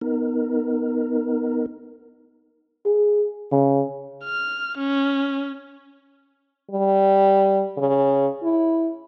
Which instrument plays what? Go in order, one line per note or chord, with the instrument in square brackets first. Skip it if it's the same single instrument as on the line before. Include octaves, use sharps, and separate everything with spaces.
[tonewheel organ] B3 D#4 A#4
[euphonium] G#4
C#3
[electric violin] F6
C#4
[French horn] G3
C#3
E4